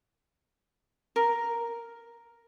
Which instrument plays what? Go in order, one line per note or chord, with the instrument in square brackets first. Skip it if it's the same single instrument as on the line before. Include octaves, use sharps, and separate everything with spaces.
[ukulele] A#4